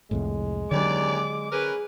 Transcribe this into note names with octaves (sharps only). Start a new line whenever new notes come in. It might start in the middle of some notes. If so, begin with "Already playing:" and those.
C2 F2 A2 G#3
D#2 D3 F#3 C#4 D5 D6
C#4 G#4 A#4 B4